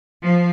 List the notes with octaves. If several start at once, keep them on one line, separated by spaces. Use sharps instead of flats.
F3